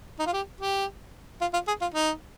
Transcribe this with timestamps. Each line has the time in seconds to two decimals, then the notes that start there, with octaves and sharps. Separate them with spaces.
0.19 D#4
0.27 F4
0.33 G4
0.61 G4
1.41 F4
1.53 F4
1.68 G#4
1.81 F4
1.94 D#4